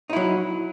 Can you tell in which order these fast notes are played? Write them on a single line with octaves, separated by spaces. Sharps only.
D#4 E4 F#3